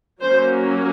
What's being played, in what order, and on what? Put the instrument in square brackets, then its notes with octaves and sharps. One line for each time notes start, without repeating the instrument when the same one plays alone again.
[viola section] F#3 A#3 C#4 C5